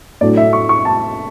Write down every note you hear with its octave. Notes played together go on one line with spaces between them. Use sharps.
A2 F#3 A3 D4 D5
E5
C#6
C#6
A5